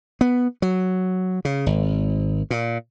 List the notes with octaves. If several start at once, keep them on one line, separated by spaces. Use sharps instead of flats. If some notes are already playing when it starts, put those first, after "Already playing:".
B3
F#3
C#3
G#1
A#2